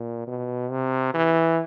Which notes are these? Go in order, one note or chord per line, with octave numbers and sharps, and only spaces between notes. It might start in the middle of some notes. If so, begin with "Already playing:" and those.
Already playing: A#2
B2
C3
E3